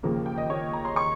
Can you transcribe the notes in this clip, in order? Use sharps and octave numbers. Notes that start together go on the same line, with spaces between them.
D#2 C#3 F3 A#3
G5
D#5
C#5
A#5
C6
C#6